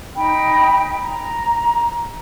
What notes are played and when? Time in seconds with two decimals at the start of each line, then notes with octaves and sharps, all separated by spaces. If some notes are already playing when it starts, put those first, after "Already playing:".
0.15 D#4 G5 B5
1.00 A#5